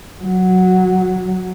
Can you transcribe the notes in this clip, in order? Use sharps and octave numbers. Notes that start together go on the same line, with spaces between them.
F#3